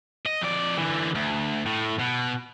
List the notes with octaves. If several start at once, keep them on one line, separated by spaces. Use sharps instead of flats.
D#5
F2 D5
D3 E3
D2
A2
B2